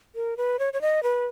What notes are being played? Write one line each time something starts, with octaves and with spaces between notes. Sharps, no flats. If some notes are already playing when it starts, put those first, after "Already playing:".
A#4
B4
C#5
C#5
D#5
B4